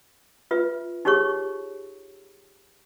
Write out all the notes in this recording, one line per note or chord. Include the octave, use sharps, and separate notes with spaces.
F4 B4 E5
D#4 G4 G#4 C#5 C#6